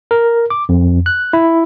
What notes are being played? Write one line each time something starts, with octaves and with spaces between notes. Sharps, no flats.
A#4
D6
F2
F#6
E4